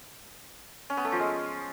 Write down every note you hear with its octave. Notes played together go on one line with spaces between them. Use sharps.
C#4
B3
A3
F3
G#3